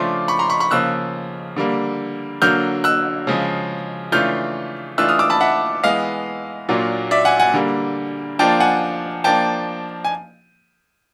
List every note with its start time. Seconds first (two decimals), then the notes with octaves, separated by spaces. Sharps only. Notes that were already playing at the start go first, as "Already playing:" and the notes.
Already playing: C#3 F3 A3 D4 F4 C6 D6
0.28 B5 C#6
0.39 A#5 C6
0.50 B5 C#6
0.60 B5 C#6
0.71 C#3 F3 A#3 E6 F#6
1.56 D3 G3 A#3
2.42 D3 F#3 A#3 F6 G6
2.84 E6 F#6
3.27 C#3 F3 G#3
4.12 C#3 E3 A3 D4 F4 F6 G6
4.98 E3 A3 D4 F4 E6 F#6
5.09 D#6 F6
5.19 D6 E6
5.30 A5 B5
5.40 E5 F#5
5.83 E3 G#3 B3 D#5 F5
6.69 A#2 F#3 A#3 D4 F4
7.11 D5 E5
7.25 F#5 G#5
7.40 F#5 G#5
7.54 D3 G3 A#3
8.39 F3 A#3 D4 F4 G5 A5
8.60 F#5 G#5
9.24 F3 A#3 D4 G5 A5
10.04 G#5